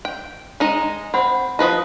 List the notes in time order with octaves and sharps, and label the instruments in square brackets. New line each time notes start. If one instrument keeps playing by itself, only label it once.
[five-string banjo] G5
G#3 D#4 D#5
[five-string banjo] C4 [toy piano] C5 F#5 B5
[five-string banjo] F3 B4 D#5 [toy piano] E4 D#6